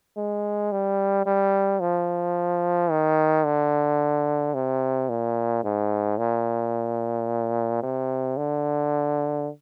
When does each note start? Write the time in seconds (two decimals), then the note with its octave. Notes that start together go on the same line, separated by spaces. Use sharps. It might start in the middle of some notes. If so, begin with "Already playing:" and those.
0.17 G#3
0.72 G3
1.26 G3
1.80 F3
2.91 D#3
3.44 D3
4.54 C3
5.09 A#2
5.64 G#2
6.18 A#2
7.83 C3
8.37 D3